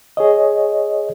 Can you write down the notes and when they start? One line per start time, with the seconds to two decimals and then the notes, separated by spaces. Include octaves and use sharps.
0.17 G#4 C#5 D#5